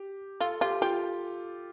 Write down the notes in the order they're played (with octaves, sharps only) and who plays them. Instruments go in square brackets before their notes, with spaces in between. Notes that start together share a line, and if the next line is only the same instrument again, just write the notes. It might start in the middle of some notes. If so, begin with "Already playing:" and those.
Already playing: [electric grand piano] G4
[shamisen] F4 [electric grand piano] A4
[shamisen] F4 [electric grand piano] G4
[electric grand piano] F4 [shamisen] G4